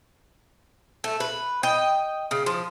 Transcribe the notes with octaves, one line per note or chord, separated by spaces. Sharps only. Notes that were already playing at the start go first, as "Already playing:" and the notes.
A3
B4
D#5 G5
C#3
F3